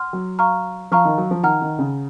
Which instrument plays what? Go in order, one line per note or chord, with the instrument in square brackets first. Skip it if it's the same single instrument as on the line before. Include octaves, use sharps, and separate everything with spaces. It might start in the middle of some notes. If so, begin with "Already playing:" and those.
Already playing: [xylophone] F#5 C6 F6
[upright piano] F#3
[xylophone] F5 A#5 C#6 F6
[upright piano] F3 [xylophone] F5 A#5 C#6 F6
[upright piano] D#3
F#3
F3
[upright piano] D#3 [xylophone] F#5 A#5 F6
[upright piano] D#3
C#3